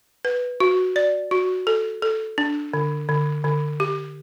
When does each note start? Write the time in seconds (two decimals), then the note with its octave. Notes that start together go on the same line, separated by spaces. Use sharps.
0.25 B4
0.60 F#4
0.96 D5
1.31 F#4
1.67 A4
2.02 A4
2.38 D4
2.74 D3
3.09 D3
3.44 D3
3.80 G4